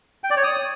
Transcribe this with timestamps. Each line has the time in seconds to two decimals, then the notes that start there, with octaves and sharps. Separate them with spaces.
0.24 G5
0.30 D5
0.37 C#5
0.44 D#6